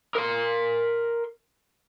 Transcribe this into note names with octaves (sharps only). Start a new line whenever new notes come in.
A#4 C6